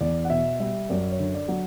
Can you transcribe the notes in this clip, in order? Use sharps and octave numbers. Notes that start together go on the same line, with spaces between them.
E2 D5
F#5
B2 E5
G3 E5
F#2 D5
C#5
D3
D5
F#3